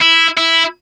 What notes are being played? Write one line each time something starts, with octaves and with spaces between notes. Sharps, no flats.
E4
E4